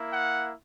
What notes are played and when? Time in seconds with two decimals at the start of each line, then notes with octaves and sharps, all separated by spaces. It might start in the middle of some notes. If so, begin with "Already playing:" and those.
Already playing: A#3 E4
0.12 F#5